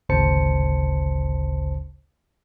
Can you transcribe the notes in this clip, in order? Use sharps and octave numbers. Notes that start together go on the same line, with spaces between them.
G#1 D2 C#3 C5 A5 C#7